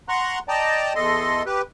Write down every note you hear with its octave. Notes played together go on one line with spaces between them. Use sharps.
F#5 A#5 C6 C#6 F#6
D5 D#5 G5 A5 A#5
E2 A4 D#5 C6
G4 B4